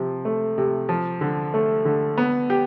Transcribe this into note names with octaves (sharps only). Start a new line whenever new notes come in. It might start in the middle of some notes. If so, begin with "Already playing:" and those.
Already playing: C3 F3
A3
C3
F3
D3
A3
D3
B3
G4